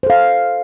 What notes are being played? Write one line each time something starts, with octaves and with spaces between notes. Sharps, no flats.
A4 C5 F5